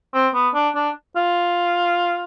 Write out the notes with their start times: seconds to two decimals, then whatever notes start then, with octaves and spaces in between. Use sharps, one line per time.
0.14 C4
0.34 B3
0.55 D4
0.75 D4
1.16 F4